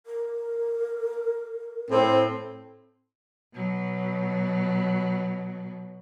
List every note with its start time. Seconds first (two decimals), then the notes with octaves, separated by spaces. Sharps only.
0.06 A#4
1.91 A2 C4
3.55 B2 F#3